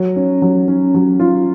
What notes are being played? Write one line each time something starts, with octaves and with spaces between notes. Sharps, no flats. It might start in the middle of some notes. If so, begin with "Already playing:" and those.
Already playing: F#3
C#4
F#3
C#4
F#3
F4